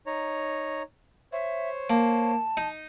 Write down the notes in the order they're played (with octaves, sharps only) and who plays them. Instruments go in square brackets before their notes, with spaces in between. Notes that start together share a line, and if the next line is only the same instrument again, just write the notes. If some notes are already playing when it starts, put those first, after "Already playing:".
[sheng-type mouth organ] D#4 C#5 A#5
[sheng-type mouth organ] C5 C#5 [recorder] E5
[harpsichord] A#3 [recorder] A5
[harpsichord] D#4